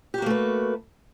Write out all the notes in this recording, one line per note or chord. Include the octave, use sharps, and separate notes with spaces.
A3 A#3 F#4 G4 B4